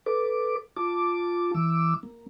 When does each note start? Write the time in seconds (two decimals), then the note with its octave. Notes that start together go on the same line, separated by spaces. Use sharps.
0.06 A4 B4 D6
0.76 F4 A5 D6
1.54 E3 D6 E6
2.03 A#3